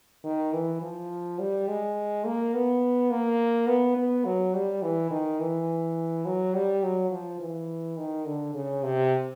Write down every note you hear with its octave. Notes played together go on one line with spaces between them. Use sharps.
D#3
E3
F3
G3
G#3
A#3
B3
A#3
B3
B3
F#3
G3
E3
D#3
E3
F#3
G3
F#3
F3
E3
D#3
D3
C#3
C3